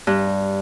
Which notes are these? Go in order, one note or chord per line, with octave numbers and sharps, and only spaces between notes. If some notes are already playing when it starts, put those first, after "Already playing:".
G2